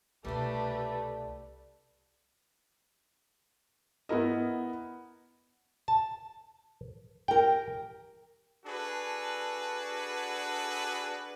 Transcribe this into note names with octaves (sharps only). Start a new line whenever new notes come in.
C2 B2 G3 A3 D4 G4 B4
B3 E4 A#4 D#5
A5
G4 A#4 G5
D4 F#4 G#4 A4 B4